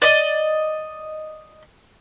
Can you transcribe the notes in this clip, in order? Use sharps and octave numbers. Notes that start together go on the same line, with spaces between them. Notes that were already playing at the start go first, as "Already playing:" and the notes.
D5 D#5